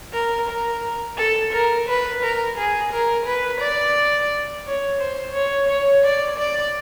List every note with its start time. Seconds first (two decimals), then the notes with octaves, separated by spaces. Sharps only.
0.14 A#4
0.48 A#4
1.18 A4
1.52 A#4
1.88 B4
2.23 A#4
2.57 G#4
2.92 A#4
3.26 B4
3.61 D5
4.66 C#5
5.00 C5
5.34 C#5
5.69 C#5
6.04 D5
6.38 D5